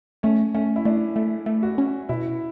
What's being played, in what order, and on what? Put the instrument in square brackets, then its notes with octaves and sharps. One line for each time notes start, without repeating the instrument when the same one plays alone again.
[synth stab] A3 [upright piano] C#4
[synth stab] A3 [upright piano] C#4
[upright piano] E4
[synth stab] A3 [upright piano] D4
[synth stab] A3
A3
[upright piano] F#4
[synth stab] C#4
[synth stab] B2 [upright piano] E4